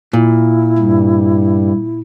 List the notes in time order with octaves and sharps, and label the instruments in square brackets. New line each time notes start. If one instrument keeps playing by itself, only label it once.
[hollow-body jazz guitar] A#2 [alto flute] E4
[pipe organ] G2